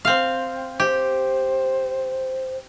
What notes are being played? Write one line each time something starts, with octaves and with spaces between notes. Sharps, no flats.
C4 F5
G4 C5